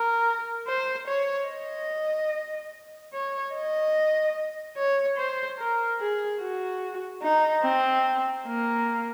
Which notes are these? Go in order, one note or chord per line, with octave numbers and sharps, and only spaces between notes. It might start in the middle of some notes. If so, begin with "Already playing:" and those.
Already playing: A#4
C5
C#5
D#5
C#5
D#5
C#5
C5
A#4
G#4
F#4
D#4
C4
A#3